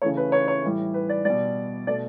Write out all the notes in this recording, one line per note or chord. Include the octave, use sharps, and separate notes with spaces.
C#3 E3 A3 C#5
B4
C#5
C#5
A2 E3 G3
B4
D5
B2 G3 D5
B2 A3 D5